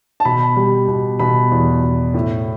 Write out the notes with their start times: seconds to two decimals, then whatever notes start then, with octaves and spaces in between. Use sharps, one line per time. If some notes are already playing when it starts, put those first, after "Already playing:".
0.20 A5
0.25 B2 B5
0.56 G3
0.88 B2
1.19 B2 B5
1.52 E2
1.83 B2
2.14 A2